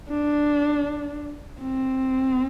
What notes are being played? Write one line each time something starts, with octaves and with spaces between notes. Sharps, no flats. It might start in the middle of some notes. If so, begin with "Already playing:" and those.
D4
C4